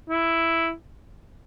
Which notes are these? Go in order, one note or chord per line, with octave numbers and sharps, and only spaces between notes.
E4